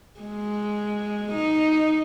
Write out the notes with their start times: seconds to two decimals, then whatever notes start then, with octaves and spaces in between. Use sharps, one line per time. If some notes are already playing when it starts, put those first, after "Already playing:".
0.21 G#3
1.32 D#4